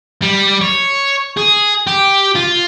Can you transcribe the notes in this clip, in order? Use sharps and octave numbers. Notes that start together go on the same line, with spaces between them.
G3
C#5
G#4
G4
F4